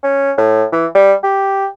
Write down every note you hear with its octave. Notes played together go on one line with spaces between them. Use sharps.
C#4
A2
E3
G3
G4